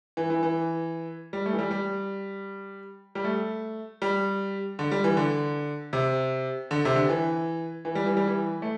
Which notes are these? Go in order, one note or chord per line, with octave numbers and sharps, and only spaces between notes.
E3
E3
E3
G3
A3
E3
G3
G3
G3
A3
G3
D3
G3
E3
D3
C3
D3
C3
D3
E3
E3
G3
E3
G3
E3
A3